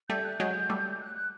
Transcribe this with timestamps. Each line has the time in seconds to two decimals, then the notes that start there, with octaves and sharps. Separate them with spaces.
0.09 G3 A3 G6
0.25 F#6
0.39 F#3 G#3 G6
0.70 G3 A3
1.01 F#6
1.15 F#6